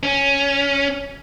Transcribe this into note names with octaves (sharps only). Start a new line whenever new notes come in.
C#4